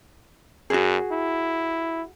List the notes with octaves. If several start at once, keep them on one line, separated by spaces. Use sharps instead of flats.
F#2 F#4 G#4
E4